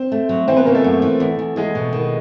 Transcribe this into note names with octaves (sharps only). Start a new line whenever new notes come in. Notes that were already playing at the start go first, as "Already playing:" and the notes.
Already playing: C4 C5
A3
F#3
E3 C4 C5
B3 B4
C#3 A#3 A#4
A3 A4
F#2
E3
E2
E2
E2 G#3 G#4
B2
D#3